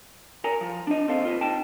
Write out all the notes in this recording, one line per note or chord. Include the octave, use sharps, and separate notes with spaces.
A#4 G#5 A#5
F3
D4 D#5
D#2 C4 A4 F5
F4 B4 D#5
D#4 G5 A5